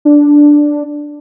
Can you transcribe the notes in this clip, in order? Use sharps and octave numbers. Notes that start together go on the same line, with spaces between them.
D4